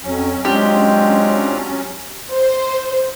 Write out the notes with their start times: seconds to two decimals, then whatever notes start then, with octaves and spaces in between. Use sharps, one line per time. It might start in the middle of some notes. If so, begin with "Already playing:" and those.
0.03 F2 F#3 C#4
0.45 G#3 C4 D4 F4 G4
2.33 C5